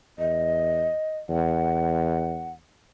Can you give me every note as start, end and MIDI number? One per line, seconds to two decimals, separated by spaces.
0.19 0.91 40
0.19 1.18 75
1.29 2.61 40
1.29 2.52 78